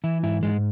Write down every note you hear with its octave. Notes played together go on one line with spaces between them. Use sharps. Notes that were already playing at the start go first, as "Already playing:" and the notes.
E3 E4
G#2 E4
G#2 G#3